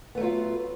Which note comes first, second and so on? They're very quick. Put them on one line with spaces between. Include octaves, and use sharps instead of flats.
B3 A3 F#3 F4